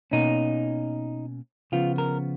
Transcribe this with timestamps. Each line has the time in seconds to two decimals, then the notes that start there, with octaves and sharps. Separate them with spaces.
0.11 B2 A#3 C#4 D#4
1.72 C#3 F3 B3 F4
1.98 A#4